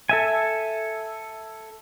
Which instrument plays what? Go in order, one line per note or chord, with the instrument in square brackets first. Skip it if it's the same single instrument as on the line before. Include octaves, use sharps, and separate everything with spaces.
[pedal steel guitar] A4 E5 G#5